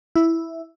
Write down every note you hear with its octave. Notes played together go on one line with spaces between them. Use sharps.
E4